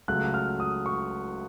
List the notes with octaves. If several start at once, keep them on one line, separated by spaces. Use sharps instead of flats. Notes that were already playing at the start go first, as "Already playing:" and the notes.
C#2 C#3 F#3 A3 F#6
F6
D#6
C#6